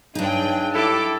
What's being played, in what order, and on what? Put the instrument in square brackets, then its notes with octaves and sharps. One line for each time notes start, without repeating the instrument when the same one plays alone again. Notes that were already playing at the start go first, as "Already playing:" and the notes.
[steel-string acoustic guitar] G2 D#4 [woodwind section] C#3 F#3 D4 [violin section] G#4 G5
[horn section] E4 A4 [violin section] G4 A5 D6